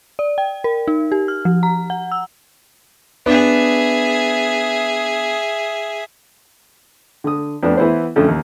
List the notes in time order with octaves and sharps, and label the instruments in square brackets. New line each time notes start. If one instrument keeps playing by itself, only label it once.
[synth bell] D5
G5
A#4
D#4
G4
F6
F3
A#5
F#5
E6
[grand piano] B3 D4 [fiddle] G#4 E5
[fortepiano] D3 D#6
F2 B3 D4
E3 B3 E4 C5
F2 D3 A3 C#4
D#2